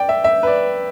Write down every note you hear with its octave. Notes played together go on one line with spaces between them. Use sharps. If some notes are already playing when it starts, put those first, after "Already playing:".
Already playing: D5 G5
E5
E5
B4
D5